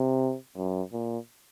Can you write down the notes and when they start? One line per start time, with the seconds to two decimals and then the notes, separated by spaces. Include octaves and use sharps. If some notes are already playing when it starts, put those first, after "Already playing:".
Already playing: C3
0.57 F#2
0.93 A#2